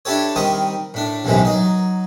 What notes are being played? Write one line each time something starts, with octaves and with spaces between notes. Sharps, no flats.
D4 E4 G4 A4 C#5
D#3 G3 C4 C#6 D#6
A2 D4
B1 F#2 A2 C3 E3 G#3
F#3 D#4